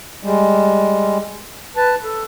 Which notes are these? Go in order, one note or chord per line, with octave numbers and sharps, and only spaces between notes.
G3 G#3
B4 A5
A4